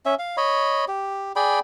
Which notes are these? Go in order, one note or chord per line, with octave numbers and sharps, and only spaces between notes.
C#4 E5
F5
C#5 D#5 B5
G4
G#4 D5 G5 B5